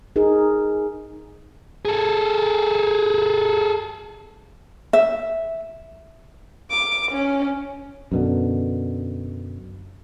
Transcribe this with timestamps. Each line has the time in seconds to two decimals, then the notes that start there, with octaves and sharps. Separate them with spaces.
0.16 D#4 G#4 A#4
1.85 G#4 A4
4.93 E5
6.71 D6
7.11 C#4
8.12 F#2 B2 D3